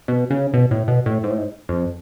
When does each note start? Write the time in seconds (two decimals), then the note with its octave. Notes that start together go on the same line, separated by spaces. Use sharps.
0.08 B2
0.30 C#3
0.54 B2
0.71 A2
0.88 B2
1.06 A2
1.23 G#2
1.30 A2
1.38 G#2
1.69 F2